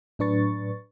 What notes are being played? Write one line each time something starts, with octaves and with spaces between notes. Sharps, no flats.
A2 F#3 D4 B4 C#6 A6